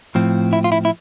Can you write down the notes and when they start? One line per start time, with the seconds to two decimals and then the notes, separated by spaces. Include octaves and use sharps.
0.15 A2 F3 C4
0.53 E4
0.64 F4
0.72 E4
0.85 E4